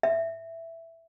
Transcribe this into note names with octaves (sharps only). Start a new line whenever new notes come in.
E5